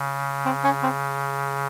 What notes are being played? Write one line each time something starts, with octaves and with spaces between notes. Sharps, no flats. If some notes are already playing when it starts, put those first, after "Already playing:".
Already playing: C#3
C4
C#4
C4